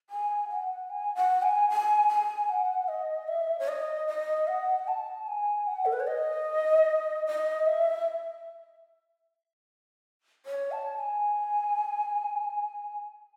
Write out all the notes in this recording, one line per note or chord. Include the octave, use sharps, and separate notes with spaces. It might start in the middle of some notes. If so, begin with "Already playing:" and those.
G#5
F#5
G#5
F#5
G#5
G#5
G#5
F#5
D#5
E5
C#5
D#5
D#5
F#5
A5
G#5
F#5
A4
B4
C#5
D#5
D#5
E5
C#5
A5
G#5